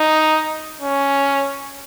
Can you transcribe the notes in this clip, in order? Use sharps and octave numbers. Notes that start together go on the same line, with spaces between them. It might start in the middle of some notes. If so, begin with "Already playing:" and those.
Already playing: D#4
C#4